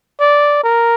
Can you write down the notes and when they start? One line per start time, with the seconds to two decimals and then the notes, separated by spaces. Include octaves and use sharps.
0.20 D5
0.63 A#4